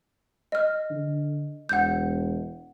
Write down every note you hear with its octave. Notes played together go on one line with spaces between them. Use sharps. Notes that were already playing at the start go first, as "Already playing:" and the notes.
D#5 F6
D3
E1 F#5 G6